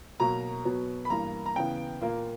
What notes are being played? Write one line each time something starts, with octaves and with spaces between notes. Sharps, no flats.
B2 F#3 A#3 A#5
B2 F#3 B3
B5
G2 E3 A#3 A#5
A#5
C#3 E3 B3 G5
A#2 A#3